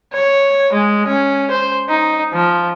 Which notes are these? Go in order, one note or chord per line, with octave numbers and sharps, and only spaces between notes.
C#5
G#3
C#4
C5
D#4
F3